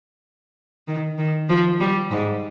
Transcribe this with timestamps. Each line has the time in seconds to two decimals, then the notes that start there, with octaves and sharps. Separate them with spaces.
0.87 D#3
1.18 D#3
1.49 F3
1.80 G3
2.11 G#2